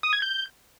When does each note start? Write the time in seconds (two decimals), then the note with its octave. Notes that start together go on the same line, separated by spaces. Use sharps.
0.03 D#6
0.13 G#6
0.22 G6